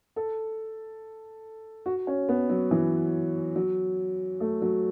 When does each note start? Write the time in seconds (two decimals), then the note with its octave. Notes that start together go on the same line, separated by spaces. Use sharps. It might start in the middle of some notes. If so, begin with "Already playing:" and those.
0.16 A4
1.86 F#4
2.07 C#4
2.29 B3
2.50 F#3
2.71 E3
3.56 F#3
4.40 A3
4.62 F#3